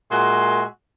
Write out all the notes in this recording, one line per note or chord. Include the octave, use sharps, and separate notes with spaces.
A#2 G#3 F#4 G#4 E5 C6